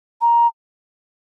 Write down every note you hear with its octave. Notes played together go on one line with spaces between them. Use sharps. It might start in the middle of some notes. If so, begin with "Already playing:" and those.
A#5